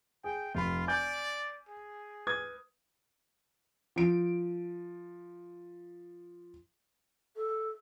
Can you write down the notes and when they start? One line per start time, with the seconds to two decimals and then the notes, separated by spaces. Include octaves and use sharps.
0.24 G#4 G5
0.55 F1 F4 B5
0.88 D5 G#5 G6
1.69 G#4
2.27 B4 D#6 G#6
3.96 F3 D7
7.36 A4